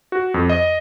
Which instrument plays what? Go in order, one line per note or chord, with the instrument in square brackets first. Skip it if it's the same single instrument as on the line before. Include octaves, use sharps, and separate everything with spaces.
[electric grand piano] F#4
F2
D#5